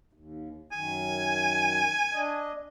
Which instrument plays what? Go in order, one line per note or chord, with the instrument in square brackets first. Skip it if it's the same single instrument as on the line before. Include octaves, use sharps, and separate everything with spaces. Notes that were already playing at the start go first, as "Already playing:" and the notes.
[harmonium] D#2
[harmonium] F#2 D#3 [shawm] G#5
[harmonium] D4 D#5